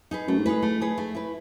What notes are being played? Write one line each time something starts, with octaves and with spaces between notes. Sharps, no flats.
D#4 G#4 B4
F#2 A3
G#2
A2 D#4 G#4 B4
A3
D#4 G#4 B4
A3
E4 B4